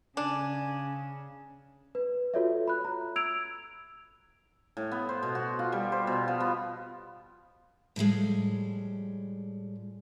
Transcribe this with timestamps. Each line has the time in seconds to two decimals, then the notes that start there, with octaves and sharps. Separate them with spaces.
0.17 C#3 D4 G#5
1.95 B4
2.34 F4 F#4 A4 C#5 D5 E5
2.68 B5 F#6
2.85 A#5
3.16 E6 G#6 D7 F7
4.77 A2
4.92 B3
5.09 C5
5.23 B2
5.35 F#4
5.59 F4
5.72 G3
5.92 C5
6.07 B2
6.28 F3
6.40 B3
7.96 A2 F3 G3 G#3